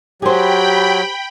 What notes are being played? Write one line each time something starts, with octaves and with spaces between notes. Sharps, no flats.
F#3 G4 G#4 C5 G5 B5